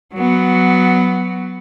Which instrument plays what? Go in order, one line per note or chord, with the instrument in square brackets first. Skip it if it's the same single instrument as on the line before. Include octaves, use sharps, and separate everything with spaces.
[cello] F#3 B3